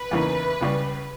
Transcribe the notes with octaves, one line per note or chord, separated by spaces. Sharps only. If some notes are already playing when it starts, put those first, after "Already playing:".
Already playing: B4
E2 C#3 E3 A#3 D#4
C#2 C#3 G3